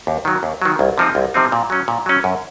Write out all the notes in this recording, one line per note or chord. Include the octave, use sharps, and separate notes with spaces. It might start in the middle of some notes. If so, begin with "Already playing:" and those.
D#2
D#3 F#3
D#2
D#3 F#3
C2
C3 F3 C4 D#4
C2
C3 F3 C4 D#4
A#2
F#3 C#4
A#2
F#3 C#4
F#2